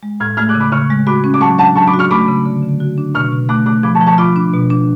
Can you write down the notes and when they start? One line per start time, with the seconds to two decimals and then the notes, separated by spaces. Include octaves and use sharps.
0.03 G#3
0.20 A2 F6 G#6
0.37 A3 F6 G#6
0.49 D6 F#6
0.55 C#3
0.60 B5 D6
0.72 C#3 C#6 F6
0.90 G#3
1.07 F#4 B5 D6
1.24 C#4
1.34 D6
1.41 F#3 A5 C#6
1.58 D4 F#5 A5
1.76 F#3 A5 C#6
1.87 B5 D6
1.93 F#4
1.99 C#6 F6
2.11 A3 B5 D6
2.28 C#3
2.45 D3
2.63 D3
2.80 F#4
2.98 D4
3.14 B2 C#6 F6
3.32 B2
3.49 A3 D6 F#6
3.66 A3 D6 F#6
3.83 F3 B5 D6
3.95 A5 C#6
4.01 F3
4.06 A5 C#6
4.18 F4 B5 D6
4.36 D4
4.53 B2
4.70 D4